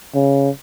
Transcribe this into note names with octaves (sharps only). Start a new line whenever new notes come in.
C#3